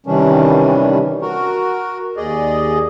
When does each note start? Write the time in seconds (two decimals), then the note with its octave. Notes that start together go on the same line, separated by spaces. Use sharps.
0.06 C3 D#3 E3 G3 C#4 D4
1.22 F#4 A#4
2.17 D#2 G#4 D5 D#5